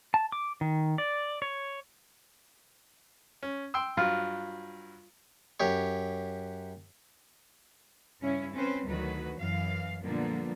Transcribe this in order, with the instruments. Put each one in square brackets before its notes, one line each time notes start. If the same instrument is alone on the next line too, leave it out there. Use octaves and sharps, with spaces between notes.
[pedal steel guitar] A5
D6
D#3
D5
C#5
[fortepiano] C#4
G5 C6 E6
[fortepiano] G2 F#3 [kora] F4
[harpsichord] F#2 G4 C#5
[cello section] G2 C#3 C#4 E4
C4 C#4 B4 C5
D2 D#3 F#3 F#4 B4
F#2 E3 F5
A#2 D3 F3 G3 A#3 B3